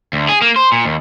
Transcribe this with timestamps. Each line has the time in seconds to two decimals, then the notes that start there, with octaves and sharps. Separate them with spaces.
0.13 D2
0.29 G#4
0.42 A#3
0.56 C5
0.72 A#2
0.85 D#2